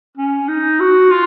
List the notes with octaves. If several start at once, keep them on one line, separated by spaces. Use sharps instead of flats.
C#4
D#4
F#4
F4